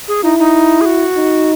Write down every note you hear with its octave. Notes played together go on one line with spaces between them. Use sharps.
G#4
D#4 E4
D#4
G#4
F#4
D#4